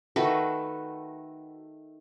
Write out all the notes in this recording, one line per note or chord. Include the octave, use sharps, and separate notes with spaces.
D#3 A3 F#4 B4